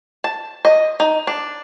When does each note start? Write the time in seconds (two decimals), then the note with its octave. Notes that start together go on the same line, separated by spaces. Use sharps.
0.24 A5
0.65 D#5
1.00 D#4
1.27 D4